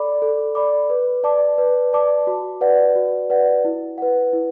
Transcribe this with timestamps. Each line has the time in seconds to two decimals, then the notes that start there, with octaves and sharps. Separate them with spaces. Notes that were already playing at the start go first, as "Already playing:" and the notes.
Already playing: A4 D5 B5 D6
0.22 A4
0.55 D5 B5 D6
0.90 B4
1.24 D5 A5 D6
1.58 B4
1.93 D5 A5 D6
2.27 F#4
2.61 B4 D5 F#5
2.96 F#4
3.30 B4 D5 F#5
3.65 E4
3.98 B4 F#5
4.33 E4